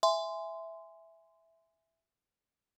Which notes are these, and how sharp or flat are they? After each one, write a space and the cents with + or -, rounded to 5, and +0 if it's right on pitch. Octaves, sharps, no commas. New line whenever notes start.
E5 +0 G#5 +0 C6 -15